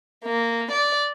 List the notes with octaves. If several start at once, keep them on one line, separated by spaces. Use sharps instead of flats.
A#3
D5